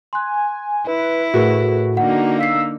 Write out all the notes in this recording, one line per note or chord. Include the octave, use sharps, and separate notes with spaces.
G#5 C6 F#6
E4 B4
A2 F#4 G#4 A#4 B4
D3 A#3 D#4 F#5
F5 E6 B6 C7